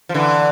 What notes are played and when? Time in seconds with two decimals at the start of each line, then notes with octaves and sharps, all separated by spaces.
0.09 F3
0.14 D3 E3